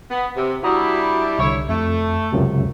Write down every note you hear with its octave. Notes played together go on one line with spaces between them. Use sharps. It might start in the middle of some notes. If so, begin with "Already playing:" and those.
B3
C3
G3 D4 E4 F#4 A#5 D#6
C2 D3 E4 C#5
F2 A3
C#2 F#2 C3